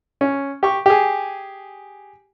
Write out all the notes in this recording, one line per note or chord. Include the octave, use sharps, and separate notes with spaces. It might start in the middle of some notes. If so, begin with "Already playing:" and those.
C#4
G4 C#6
G4 G#4